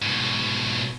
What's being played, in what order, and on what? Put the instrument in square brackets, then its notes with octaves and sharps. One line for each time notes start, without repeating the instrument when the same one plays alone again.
[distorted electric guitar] G#2 B2